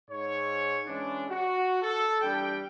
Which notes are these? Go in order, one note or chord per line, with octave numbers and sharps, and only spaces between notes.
G#2 C#5
E3 G#3 C#4 D4
F#4
A4
E2 G3 D4 G5